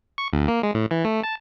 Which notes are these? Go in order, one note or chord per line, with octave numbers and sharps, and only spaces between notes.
C#6
D2
A#3
G#3
A2
E3
A3
A5